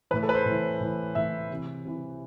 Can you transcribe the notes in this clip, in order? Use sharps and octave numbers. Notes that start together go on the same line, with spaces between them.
A2 E3 B4
A4
B4
C5
A2 E3
A2 E3
A2 E3 E5
C3 E3
C3 E3